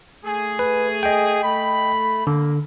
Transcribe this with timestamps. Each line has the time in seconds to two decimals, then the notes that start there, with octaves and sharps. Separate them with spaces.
0.25 A3 G#4
0.59 B4
1.03 D#5 G5
1.44 A3 B5
2.27 D3 A#3